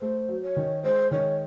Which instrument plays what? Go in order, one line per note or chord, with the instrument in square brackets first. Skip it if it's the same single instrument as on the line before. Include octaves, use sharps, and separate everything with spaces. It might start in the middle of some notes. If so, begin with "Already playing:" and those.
[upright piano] A3 [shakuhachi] C5
[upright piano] F#3
[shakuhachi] C#5
[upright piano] D#3
[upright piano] G#3 [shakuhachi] C5
[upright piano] D#3 [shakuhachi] C#5